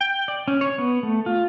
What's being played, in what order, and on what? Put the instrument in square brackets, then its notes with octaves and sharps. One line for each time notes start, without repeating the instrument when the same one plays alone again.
[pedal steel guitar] G5
D5
C#4
C#5
B3
A3
F4